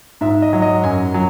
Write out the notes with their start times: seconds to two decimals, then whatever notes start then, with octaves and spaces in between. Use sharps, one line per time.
0.21 G#2 E5
0.42 D#5
0.53 F#3
0.62 D#5
0.83 F#2 G#5
1.14 F#3